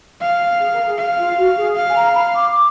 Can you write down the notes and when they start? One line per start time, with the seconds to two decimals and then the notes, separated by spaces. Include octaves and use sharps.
0.21 F5
0.60 G#4
0.72 A#4
0.84 G#4
0.98 F5
1.18 F4
1.37 F#4
1.57 G#4
1.76 F5
1.89 G#5
1.95 A#5
2.14 B5
2.34 D6
2.52 D6